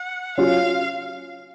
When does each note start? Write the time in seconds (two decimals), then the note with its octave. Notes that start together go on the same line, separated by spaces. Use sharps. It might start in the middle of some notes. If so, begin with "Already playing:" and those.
Already playing: F#5
0.37 F#3 C#4 F4 F5